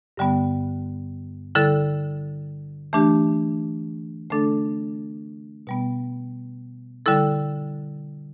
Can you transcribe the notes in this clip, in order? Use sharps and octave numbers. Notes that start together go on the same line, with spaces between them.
G2 D3 G3 B3
D3 G3 E4 A4
E3 A3 D4 G4
D3 A3 D4 A4
B2 G3 B3
D3 G3 E4 A4